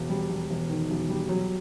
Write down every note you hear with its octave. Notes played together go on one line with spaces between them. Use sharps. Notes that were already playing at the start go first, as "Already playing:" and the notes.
Already playing: E1
G3
E1
E1
D#3
E1
G3
F#3